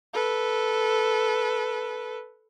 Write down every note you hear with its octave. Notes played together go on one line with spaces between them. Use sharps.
A4 B4